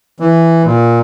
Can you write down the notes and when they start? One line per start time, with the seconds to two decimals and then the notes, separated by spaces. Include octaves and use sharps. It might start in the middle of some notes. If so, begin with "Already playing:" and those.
0.20 E3
0.65 A#2